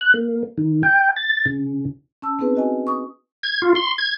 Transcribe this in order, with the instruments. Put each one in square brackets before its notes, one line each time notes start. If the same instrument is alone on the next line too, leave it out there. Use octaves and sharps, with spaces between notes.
[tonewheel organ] F#6
A#3
D#3
G5
A6
C#3
[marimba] C#4 A5 E6
B3 C4 D#4 G#4 B4
F#4 D#5 G#5
C#6 D#6
[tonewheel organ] G#6
F4
C6
G#6